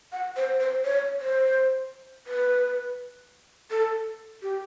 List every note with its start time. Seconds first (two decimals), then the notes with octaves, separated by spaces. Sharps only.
0.12 F#5
0.37 C5
0.60 C5
0.84 C#5
1.21 C5
2.27 B4
3.71 A4
4.42 G4